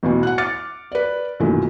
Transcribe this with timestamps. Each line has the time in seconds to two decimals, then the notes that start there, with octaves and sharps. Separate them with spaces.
0.03 A1 E2 B2
0.23 F#5 F#6
0.38 D6 F6 A6 C#7
0.92 B4 D5
1.40 B1 F#2 A#2 D#3 E3 A3